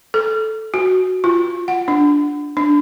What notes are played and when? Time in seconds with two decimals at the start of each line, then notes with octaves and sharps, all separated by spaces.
0.14 A4
0.74 F#4
1.24 F4
1.68 F#5
1.88 D4
2.57 D4